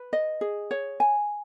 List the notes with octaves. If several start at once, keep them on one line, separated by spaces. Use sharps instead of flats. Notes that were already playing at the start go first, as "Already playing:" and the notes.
Already playing: B4
D#5
G#4
C#5
G#5